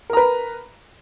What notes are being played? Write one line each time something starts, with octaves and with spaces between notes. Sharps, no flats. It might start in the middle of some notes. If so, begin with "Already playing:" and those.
A#4 B4 A#5